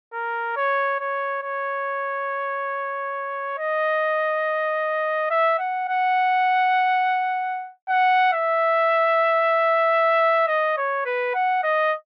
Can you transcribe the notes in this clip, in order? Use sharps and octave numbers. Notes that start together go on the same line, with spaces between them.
A#4
C#5
C#5
C#5
D#5
E5
F#5
F#5
F#5
E5
D#5
C#5
B4
F#5
D#5